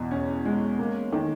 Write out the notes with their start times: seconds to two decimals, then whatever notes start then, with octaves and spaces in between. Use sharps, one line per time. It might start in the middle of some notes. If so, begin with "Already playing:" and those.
Already playing: E2 B2
0.11 C#4
0.45 G#3
0.79 A#3
1.12 D#3